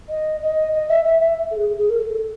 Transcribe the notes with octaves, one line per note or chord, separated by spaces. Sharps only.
D#5
D#5
D#5
E5
E5
E5
A4
G#4
G#4
A#4
A4
A4